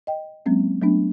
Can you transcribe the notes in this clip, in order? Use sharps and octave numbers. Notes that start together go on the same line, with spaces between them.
D#5 G5
F#3 G#3 A#3 C4 C#4
F#3 A3 B3 D4